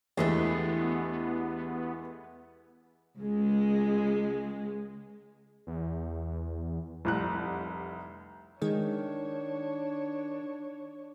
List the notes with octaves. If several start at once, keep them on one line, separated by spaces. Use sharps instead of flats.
E2 E3 G#3 A3 B3 D4 G4
C#2 G#3
E2
F1 C2 F#6
D#3 G#3 D4 G#4 C#5 D#5